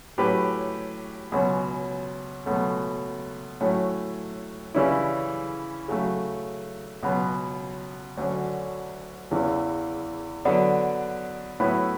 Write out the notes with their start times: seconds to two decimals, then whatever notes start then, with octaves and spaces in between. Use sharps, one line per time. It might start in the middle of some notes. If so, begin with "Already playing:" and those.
0.18 A2 F#3 C#4 G4 B4
1.32 C#2 B2 F#3 C#4
2.46 C#2 B2 F#3 A3
3.61 A2 F#3 A3 C#4
4.74 C#3 E3 G3 C#4 E4
5.88 C#3 F#3 A3
7.03 C#2 B2 F#3 B3
8.17 D2 D3 F#3 C#4
9.31 E2 C#3 E3
10.45 D3 F#3 B3 D4
11.60 A2 F#3 B3 E4 B4